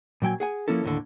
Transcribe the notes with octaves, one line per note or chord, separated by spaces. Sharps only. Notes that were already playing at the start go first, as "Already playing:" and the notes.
A#2 F#3 G5 G#5
G#4 F#5 G#5
F3 A#3 C#4 E4 A4
D#2 A2 D3